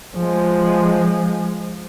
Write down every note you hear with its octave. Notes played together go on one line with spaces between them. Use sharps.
F3 G#3